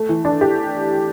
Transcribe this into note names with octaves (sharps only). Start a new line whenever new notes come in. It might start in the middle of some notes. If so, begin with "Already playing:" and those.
Already playing: A3
E3
D4
G4